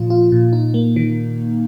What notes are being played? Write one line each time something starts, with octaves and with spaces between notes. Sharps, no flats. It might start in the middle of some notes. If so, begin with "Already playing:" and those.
Already playing: A#2 F3 F4
F4
A#2
D#4
A#3
D#3